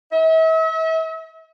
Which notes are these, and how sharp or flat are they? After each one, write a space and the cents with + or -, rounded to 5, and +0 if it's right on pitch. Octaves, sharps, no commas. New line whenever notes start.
E5 -40